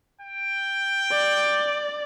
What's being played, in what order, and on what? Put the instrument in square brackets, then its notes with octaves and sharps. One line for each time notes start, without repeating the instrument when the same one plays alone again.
[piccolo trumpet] G5
[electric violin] D5